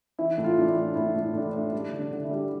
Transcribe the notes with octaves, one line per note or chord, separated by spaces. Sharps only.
E3 E4
A2
F4
A2 D4
E4
A2
A2 E4
A2
E4
A2 D4
E4
A2
G3 D4
D3
D4
D3
E4
G3